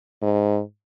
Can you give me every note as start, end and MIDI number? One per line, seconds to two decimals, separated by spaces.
0.22 0.60 44